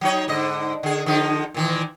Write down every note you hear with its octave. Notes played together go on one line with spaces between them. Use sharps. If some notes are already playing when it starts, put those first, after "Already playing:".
F#3 D#4 C#5
G#2 D3 D#5
D3 G#4
D3 F3 D#4
A#2 D#3 E3